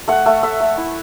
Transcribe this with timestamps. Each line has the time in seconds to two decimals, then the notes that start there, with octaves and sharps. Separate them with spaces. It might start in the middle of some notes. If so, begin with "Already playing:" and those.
0.08 A3 F#5
0.26 A3
0.43 A3 E5
0.60 A3
0.77 E4